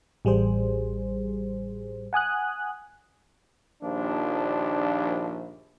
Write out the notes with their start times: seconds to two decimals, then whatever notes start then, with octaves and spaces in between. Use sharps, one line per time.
0.25 A1 G3 G#4 C5
2.13 F#5 G#5 D#6 F#6
3.82 A#1 D#2 F3 D4